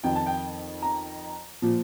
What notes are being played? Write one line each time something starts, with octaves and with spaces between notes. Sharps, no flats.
F2 D#3 G5
A5
G5
A#5
A#2 F3